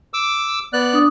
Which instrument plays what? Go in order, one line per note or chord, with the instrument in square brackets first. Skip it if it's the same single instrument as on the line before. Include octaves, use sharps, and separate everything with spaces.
[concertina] D6 E6
B3 D5 F#6
[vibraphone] D4 D#6